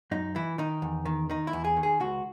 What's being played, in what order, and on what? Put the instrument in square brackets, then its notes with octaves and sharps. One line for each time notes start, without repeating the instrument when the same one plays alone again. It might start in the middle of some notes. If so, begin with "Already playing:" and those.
[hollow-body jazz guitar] F#2 D#4
E3 E4
D#3 D#4
E2
D#3
D#3 D#4
E4
E2
G#4
D#3
G#4
C#2 F#4